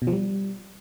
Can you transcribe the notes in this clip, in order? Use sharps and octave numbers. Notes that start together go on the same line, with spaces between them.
B2
F3
G3